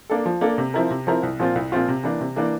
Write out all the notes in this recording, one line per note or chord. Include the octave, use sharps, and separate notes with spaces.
A#3 D4 A4
F3
A#3 D4 A4
C3
F3 C4 E4 A#4
C3
F3 C4 E4 A#4
C2
A#2 F3 C4 F4
C2
A#2 F3 C4 F4
C3
E3 A#3 D4
C3
E3 A#3 D4